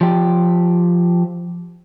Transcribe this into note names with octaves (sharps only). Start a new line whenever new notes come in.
F3 G4